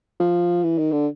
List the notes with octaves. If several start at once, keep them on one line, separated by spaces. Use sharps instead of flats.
F3
E3
D#3
D3